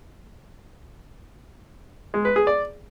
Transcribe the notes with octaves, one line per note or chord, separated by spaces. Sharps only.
G#3
B4
G#4
D5